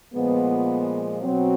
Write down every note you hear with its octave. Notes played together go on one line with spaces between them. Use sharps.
A#2 F3 G#3 B3
B2 F#3 C4